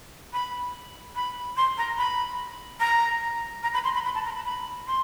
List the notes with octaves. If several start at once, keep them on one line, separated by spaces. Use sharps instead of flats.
B5
B5
C6
A#5
B5
A#5
A#5
B5
C6
B5
B5
A5
A#5
B5
B5
C6